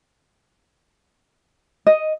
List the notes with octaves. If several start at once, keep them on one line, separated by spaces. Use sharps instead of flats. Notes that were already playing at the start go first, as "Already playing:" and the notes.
D#5